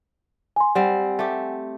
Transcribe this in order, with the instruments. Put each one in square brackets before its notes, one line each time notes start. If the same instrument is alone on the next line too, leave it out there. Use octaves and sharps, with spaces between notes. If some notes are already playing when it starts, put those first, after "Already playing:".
[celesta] G#5 C6
[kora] G3 C4 [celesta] F#5 G#5
[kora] A3 G4